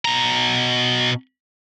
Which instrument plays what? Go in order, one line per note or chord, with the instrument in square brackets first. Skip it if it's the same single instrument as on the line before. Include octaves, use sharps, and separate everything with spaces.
[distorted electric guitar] B2 A#5